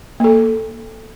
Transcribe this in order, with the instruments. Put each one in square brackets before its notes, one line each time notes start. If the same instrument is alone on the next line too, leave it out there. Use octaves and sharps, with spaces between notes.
[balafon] A#3 A4